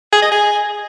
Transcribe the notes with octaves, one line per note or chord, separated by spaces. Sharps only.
G#4
D#5
G#4